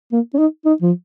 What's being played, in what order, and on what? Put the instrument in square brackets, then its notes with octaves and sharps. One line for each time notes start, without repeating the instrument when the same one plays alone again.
[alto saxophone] A#3
C#4
D#4
D#4
F3